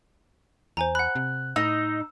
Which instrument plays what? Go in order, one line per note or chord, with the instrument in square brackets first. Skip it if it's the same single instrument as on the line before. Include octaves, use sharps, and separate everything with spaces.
[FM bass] E2 [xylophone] C5 G#5 A#5
[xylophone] F#5 B5 [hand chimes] F#6
[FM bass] C3
[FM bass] A2 [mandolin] D#4 [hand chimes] E6